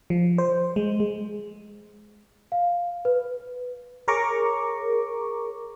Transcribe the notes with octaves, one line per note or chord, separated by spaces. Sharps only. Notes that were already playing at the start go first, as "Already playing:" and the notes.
F3
C5
G#3
G#3
F5
B4
G#4 A#4 C#5 A#5 C#6 D6